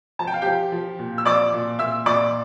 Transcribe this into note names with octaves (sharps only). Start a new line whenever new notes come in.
F3 A5
G5
F5
F3 G4 G5
F3
A#2
E6
F3 D5 D6
A#2
A#2 E5 E6
A#2 D5 D6